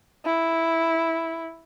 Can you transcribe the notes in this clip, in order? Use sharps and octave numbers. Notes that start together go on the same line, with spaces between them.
E4